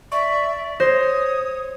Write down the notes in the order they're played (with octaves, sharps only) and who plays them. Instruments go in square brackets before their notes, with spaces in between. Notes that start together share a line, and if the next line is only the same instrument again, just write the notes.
[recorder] D5 [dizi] E5 [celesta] C#6
[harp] C5 [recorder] C#5 [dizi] D#6 [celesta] A#6